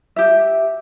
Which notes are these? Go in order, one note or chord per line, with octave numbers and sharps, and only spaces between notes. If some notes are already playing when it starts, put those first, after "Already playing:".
G4 E5